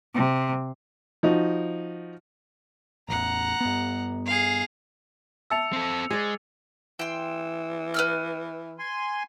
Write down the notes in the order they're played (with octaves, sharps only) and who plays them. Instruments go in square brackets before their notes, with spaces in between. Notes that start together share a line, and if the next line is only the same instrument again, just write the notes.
[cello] C3
[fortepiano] F3 D#4 F#4
[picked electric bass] A1 E2 [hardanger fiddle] F#5 A#5
[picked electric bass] G2 B3
[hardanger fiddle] G#4 F5
[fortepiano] E5 A5 [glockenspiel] E6 C#7 F7
[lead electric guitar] C4 A4
[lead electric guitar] G#3 [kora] G#4 D5
[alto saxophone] E3 [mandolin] G5 C6
[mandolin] B4 E6 F6
[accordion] G#5 C6